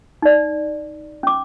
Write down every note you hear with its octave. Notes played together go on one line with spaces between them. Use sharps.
D#4 D5
C#4 D6